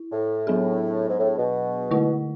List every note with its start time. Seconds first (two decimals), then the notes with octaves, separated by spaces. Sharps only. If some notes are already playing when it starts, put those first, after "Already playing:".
Already playing: E4
0.12 A2
0.47 F#3 B3 D4 G#4
1.10 G#2
1.19 A2
1.37 B2
1.91 D3 A3 E4